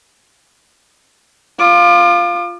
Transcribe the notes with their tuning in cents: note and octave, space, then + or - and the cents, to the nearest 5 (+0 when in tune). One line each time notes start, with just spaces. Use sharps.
F4 +0 D6 +40